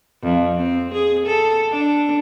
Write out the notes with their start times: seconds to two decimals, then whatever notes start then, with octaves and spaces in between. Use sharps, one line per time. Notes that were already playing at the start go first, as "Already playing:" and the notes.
0.23 F2
0.56 C4
0.94 G#4
1.26 A4
1.71 D4